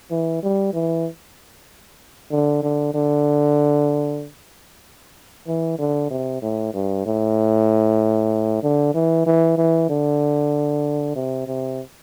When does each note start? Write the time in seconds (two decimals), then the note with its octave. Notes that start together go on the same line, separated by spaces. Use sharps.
0.11 E3
0.43 G3
0.73 E3
2.31 D3
2.63 D3
2.95 D3
5.47 E3
5.79 D3
6.10 C3
6.42 A2
6.73 G2
7.06 A2
8.63 D3
8.94 E3
9.26 E3
9.58 E3
9.89 D3
11.15 C3
11.47 C3